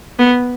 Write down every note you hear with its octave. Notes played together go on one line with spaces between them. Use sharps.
B3